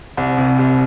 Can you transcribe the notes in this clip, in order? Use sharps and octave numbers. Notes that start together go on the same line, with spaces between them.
C2
C3
C2